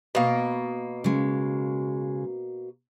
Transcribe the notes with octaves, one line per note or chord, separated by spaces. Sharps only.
B2 A#3
C#3 G#3